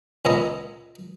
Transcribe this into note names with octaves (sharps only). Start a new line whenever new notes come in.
C#2 A#2 B3 D#5 A#5